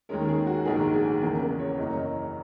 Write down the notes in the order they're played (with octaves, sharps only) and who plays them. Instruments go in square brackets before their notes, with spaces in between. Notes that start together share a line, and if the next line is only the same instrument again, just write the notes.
[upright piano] D#2 D#3 G#3 C#4 A#4
G#4
F#4
A#1 G#2 D#3 F#3 B3 G#4
G#4
E2 C#3 E3 A#3 A#4
B4
C#5
F#1 F#2 E3 A#3 C#4 D#5
C#5
D#5